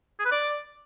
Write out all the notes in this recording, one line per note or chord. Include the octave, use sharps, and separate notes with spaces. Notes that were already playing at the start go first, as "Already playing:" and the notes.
G#4
B4
D5